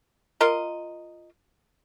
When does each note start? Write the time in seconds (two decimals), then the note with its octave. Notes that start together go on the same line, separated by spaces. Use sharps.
0.41 F4 A#4 D#5